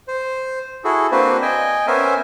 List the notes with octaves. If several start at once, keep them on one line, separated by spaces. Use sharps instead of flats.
C5
E4 F#4 G#4 A4
A#3 C4 D4 F#4 B4 C5
D#5 G5 G#5
B3 C#4 A#4 C5 E5 G#5